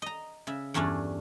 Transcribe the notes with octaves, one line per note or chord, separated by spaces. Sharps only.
D#5 A#5
C#3 E5
E2 G2 A3 C#4 D4